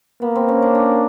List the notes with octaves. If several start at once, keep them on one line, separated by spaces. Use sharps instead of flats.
A#3 B3
C4
C#4
D4
D4